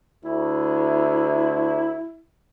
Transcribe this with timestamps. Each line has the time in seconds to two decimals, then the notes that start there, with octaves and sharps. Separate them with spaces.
0.25 D2 E4